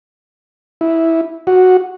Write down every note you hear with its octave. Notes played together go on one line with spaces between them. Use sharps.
E4
F#4